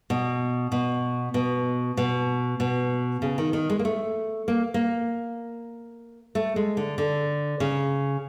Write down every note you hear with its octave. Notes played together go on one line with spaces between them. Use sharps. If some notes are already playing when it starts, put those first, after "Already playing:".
B2
B2
B2
B2
B2
C#3
D#3
D#3
G#3
A#3
A3
A#3
A#3
A3
G#3
D3
D3
C#3